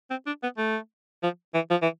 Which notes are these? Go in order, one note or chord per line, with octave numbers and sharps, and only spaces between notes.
C4
D4
B3
A3
F3
E3
F3
E3